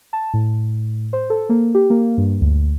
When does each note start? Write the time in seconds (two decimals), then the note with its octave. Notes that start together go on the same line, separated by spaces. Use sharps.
0.13 A5
0.34 A2
1.13 C5
1.30 A4
1.49 A#3
1.75 G4
1.90 A#3
2.18 G2
2.41 D2